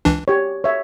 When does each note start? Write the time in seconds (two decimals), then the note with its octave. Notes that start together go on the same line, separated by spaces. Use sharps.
0.05 C#2 E3 D4
0.28 G4 C#5
0.64 C#5 E5